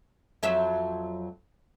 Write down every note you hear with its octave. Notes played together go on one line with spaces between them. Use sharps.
F2 F#3 E5